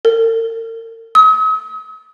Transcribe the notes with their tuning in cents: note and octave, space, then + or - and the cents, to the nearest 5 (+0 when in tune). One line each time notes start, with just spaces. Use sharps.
A#4 -45
D#6 +45